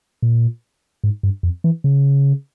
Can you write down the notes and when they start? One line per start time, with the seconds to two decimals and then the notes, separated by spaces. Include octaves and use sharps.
0.22 A#2
1.04 G#2
1.23 G2
1.43 F2
1.64 E3
1.84 C#3